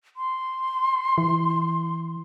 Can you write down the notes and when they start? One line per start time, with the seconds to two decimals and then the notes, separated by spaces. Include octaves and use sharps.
0.17 C6
1.18 E3